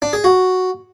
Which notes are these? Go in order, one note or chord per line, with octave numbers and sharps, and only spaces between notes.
D4
G#4
F#4